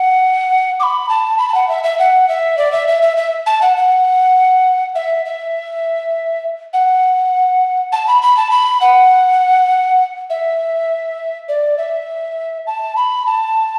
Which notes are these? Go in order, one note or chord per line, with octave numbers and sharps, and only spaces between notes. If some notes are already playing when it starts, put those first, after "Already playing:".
Already playing: F#5
D6
B5
A5
B5
A5
F#5
E5
E5
F#5
E5
D5
E5
E5
E5
E5
A5
F#5
F#5
E5
E5
F#5
A5
B5
B5
A5
B5
F#5
E5
D5
E5
A5
B5
A5